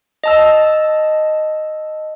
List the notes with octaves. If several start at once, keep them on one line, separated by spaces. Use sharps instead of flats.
D#5 A5 E6